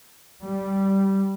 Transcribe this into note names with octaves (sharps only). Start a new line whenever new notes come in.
G3